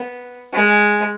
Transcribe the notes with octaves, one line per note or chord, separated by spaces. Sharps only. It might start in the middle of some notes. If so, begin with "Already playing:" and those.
Already playing: B3
G#3